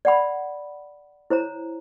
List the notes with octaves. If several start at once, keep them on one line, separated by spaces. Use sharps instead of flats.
D5 F#5 B5
E4 C5 C#5 A#5